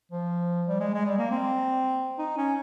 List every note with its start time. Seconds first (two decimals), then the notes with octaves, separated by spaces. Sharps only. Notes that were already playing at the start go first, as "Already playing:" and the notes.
0.12 F3
0.68 G3
0.80 G#3
0.94 G#3
1.05 G3
1.18 A#3
1.31 C4
2.18 D#4
2.37 C#4